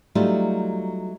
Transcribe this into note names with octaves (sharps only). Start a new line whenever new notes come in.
F#3 G3 A3 D#4 F4